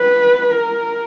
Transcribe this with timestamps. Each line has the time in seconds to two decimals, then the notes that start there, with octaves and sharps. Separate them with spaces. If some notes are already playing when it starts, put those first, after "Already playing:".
Already playing: B4
0.50 A#4